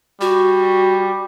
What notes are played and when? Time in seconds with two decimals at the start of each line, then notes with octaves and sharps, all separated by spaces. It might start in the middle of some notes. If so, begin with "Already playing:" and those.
0.21 G3 F#4